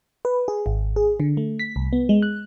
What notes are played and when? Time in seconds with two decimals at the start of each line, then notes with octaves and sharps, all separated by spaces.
0.25 B4
0.48 G#4
0.66 G#1
0.96 G#4
1.20 D3
1.37 A3
1.59 B6
1.76 C2
1.93 B3
2.09 G#3
2.22 F#6